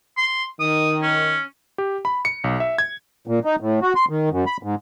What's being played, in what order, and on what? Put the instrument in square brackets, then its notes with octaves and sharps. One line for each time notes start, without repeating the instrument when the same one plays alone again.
[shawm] C6
[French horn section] D#3 [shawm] D#6
[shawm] C#4
[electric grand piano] G4
B5
C#7
B1
E5
G#6
[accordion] A#2
D#4
A2
F#4
C6
D#3
F#2
B5
G#2